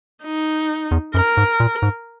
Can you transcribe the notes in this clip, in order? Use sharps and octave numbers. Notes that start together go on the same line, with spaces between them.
D#4
E2
F#2 A#4
G#2
A#2
G#2